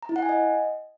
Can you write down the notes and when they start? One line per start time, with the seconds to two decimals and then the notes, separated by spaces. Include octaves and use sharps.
0.03 A#5
0.09 E4
0.16 F#5
0.22 G#5
0.29 D#5